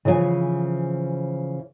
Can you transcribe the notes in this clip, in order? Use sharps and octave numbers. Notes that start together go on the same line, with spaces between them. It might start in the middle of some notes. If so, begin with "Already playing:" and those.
C#3 E3 F3 D5 G#5